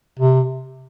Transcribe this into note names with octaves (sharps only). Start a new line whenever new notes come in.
C3